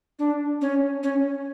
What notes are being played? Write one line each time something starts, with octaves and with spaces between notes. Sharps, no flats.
D4
C#4
C#4